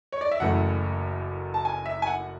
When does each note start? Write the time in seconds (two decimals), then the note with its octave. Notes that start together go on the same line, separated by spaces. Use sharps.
0.12 C#5
0.21 D5
0.31 E5
0.40 F#1 F#2 E3 A3 F#5
1.54 A5
1.65 G#5
1.86 E5
2.02 G#5
2.07 F#5